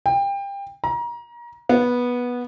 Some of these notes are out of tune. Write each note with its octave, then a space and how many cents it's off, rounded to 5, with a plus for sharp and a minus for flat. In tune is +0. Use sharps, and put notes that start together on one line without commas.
G5 +25
A#5 +30
B3 -15